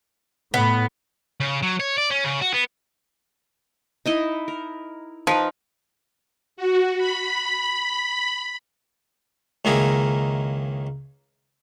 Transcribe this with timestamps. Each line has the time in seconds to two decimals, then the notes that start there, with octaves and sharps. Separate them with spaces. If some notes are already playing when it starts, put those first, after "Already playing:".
0.54 A2 B3
1.40 C#3
1.63 F#3
1.80 C#5
1.98 D5
2.11 C#4
2.24 C#3
2.42 F#4
2.54 B3
4.06 D#4 E4 D#5
4.48 A#4
5.27 F3 D#4 A#4 B4
6.56 F#4
6.97 B5
9.65 C#2 D#3 A#3 E4 G#4 A#5